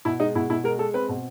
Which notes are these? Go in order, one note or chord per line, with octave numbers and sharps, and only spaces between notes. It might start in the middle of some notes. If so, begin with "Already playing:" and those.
B2 E4
G#3 D#4
B2 E4
B2 E4
G#3 A#4
G#3 A4
C4 B4
B2